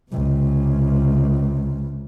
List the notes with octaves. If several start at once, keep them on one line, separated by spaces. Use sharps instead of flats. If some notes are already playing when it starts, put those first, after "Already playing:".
C#2 C3